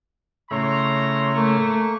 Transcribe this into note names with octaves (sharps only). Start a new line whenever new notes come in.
A2 C#3 E4 C#5 A#5 C6
A3 A#3 C#6